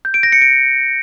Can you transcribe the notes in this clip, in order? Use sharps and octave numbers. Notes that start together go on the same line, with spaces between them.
G6
D7
A#6
C#7
D7